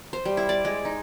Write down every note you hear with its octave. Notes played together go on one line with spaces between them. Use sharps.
C5
G3
E4
D5
G#3
D#4